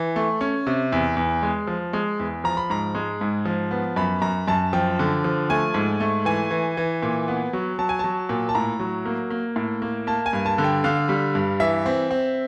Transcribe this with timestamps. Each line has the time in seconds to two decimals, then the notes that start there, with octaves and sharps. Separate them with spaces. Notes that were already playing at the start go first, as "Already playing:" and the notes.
Already playing: E3
0.16 A3
0.41 C#4
0.67 C3
0.92 E2
1.17 E2
1.43 G#3
1.67 F3
1.93 G#3
2.19 E2
2.44 F3 A#5
2.57 B5
2.70 G#2 A#5
2.95 G#3
3.21 G#2
3.45 F3
3.71 B3
3.96 F#2 B5
4.22 F#2 A#5
4.48 F#2 A5
4.73 F3 G5
4.99 D3
5.24 F3
5.50 A3 G#5
5.74 G#2
6.00 A3
6.25 E3 G#5
6.51 E3
6.77 E3
7.02 A#2
7.28 B3
7.53 F#3
7.79 F#3 A5
7.89 G#5
7.99 F#3 A5
8.29 A#2
8.49 A5
8.55 A2 A#5
8.80 F#3
9.05 A#3
9.30 A#3
9.56 A2
9.82 A#3
10.07 A#3 A5
10.26 G#5
10.33 G2
10.46 A5
10.58 D3
10.64 G5
10.84 D3 F5
11.09 G3
11.35 G2
11.60 E3 E5
11.86 C4
12.11 C4